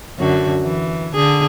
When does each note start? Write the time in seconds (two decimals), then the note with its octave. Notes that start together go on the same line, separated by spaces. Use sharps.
0.19 F#2 D3 F#4
0.65 E3
1.14 D3 G#4